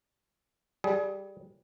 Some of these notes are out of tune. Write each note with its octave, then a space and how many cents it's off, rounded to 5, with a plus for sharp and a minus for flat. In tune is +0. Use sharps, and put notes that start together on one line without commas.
G3 +0 G#4 +25